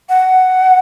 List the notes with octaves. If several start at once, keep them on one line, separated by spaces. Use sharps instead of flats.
F#5